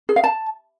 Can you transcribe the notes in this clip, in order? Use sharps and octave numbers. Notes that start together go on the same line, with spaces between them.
G#4
F5
A5